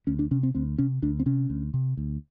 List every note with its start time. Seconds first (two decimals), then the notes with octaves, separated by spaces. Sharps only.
0.07 D2 C#4
0.19 D4
0.31 C3 C#4
0.43 C4
0.55 D2 C4
0.78 C3 C#4
1.02 D2 D4
1.20 C4
1.26 C3 C#4
1.50 D2
1.74 C3
1.97 D2